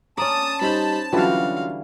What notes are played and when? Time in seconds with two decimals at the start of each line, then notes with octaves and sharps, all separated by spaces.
0.18 C#4 D5 A5 A#5 D#6
0.61 G3 D#4 C5 B5 E7
1.12 D3 E3 F#3 G3 C#4 F4 F#4 F5